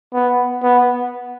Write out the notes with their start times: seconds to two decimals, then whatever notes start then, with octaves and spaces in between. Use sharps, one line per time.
0.14 B3
0.63 B3